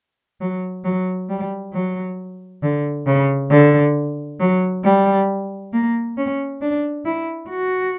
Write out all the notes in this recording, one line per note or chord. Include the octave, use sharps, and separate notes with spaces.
F#3
F#3
G3
F#3
D3
C#3
D3
F#3
G3
A#3
C#4
D4
E4
F#4